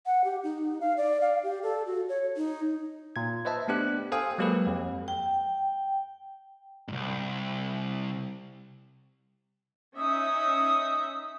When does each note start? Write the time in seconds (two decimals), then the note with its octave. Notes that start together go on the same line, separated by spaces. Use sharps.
0.06 F#5
0.24 G4
0.43 D#4
0.81 F5
0.97 D5
1.21 F5
1.43 G4
1.63 A4
1.86 F#4
2.09 C#5
2.37 D#4
3.16 A#2 G#6
3.45 B4 C5 D#5 E5 A5
3.68 A3 B3 D4 G4 F#6
4.12 A4 C5 F5 G5 G#5 D#6
4.38 F#3 G#3 A#3 G4 A4 B4
4.67 F2
5.08 G5
6.88 C2 G#2
9.97 C#4 D#4 E5 D#6